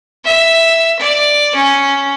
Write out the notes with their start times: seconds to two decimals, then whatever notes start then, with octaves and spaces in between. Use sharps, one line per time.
0.25 E5
1.00 D5
1.56 C#4